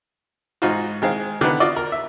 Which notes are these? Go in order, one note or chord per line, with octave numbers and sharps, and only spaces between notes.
G#2 D#4 F4 F#4
D#3 G#3 C4 F5
D3 D#3 B3
F4 F#4 D5 D#5
A#4
E5